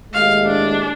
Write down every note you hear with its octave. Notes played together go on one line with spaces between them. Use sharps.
D#2 A2 G#3 F5
D4